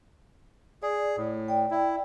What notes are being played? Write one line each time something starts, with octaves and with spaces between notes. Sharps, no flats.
G#4 D5
A2
D5 G5
E4